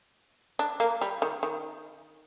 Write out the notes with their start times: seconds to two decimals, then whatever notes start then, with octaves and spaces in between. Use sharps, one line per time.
0.59 D4
0.80 A#3
1.01 G3
1.22 D#3
1.43 D#3